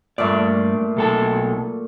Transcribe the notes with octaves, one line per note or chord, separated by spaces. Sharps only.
G2 A#2 A3 D5
B1 A4 A5